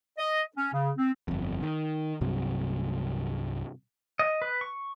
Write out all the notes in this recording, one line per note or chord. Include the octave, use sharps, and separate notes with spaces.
D#5
C#4
C#3
C4
G1 F2
D#3
C2 G2 C3 F#3
D#5
B4
C#6